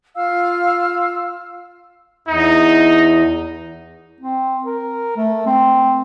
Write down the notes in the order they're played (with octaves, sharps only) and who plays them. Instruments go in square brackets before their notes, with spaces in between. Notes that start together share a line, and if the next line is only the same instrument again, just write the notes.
[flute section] F4 F5 E6
[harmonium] E2 [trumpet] D#4
[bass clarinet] C4
A#4
A3
C4